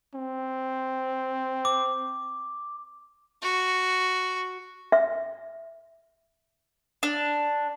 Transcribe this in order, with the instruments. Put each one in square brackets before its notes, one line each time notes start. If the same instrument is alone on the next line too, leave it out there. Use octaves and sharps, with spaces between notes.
[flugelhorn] C4
[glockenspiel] D6
[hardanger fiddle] F#4
[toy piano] E5
[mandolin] D4